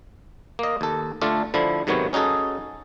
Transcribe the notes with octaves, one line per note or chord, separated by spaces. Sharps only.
A#3 D#5
D#2 A4
D3 A3 D4 F4 A4
D3 F3 E4
G#2 C3 D#3 F#3 B3 C#5
C#4 D#4 F#4 G#4 A4